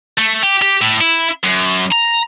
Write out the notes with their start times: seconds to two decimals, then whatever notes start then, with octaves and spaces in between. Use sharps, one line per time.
0.18 A3
0.43 G4
0.62 G4
0.81 A2
1.01 E4
1.44 F#2
1.91 A#5